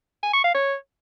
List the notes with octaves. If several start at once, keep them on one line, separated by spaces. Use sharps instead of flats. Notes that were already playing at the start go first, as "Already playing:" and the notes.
G#5
C#6
F5
C#5